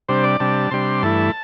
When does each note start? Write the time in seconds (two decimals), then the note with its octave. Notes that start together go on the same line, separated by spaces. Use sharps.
0.09 C3 G3 D4 C5
0.24 D5
0.40 C3 G3 D4 A5
0.71 C3 G3 D4 C6
1.02 G2 E3 A3 E4 A5